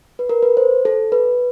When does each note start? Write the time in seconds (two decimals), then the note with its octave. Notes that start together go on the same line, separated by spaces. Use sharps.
0.19 B4
0.29 A#4
0.43 B4
0.57 C5
0.85 A4
1.12 B4